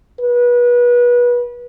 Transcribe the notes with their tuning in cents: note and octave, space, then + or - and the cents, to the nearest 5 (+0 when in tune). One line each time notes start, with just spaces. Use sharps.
B4 -30